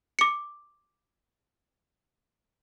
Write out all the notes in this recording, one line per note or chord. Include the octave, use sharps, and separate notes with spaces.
D6 C#7